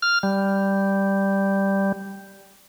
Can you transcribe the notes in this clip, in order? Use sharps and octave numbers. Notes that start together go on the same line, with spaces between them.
F6
G3